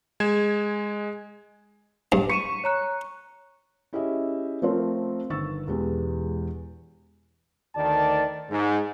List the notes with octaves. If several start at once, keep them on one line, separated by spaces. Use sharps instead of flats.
G#3 G#6 E7
G2
C#6 B6 D#7 E7
C#5 A#5 F#6
C#4 E4 G4 G#4 D#5 E5
F3 A3 C4 F4 A#4 C5
G1 D#3 C#6 E6 A6
E1 E2 G#3 G4
D2 D#3 D5 A5
G#2